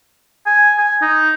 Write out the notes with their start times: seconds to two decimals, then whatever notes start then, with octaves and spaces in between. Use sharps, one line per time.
0.46 G#5
0.78 G#5
1.02 D#4